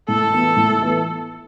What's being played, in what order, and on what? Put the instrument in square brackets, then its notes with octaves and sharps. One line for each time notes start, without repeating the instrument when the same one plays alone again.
[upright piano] A2 [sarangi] A4
[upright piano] E3 B3
A2
E3 B3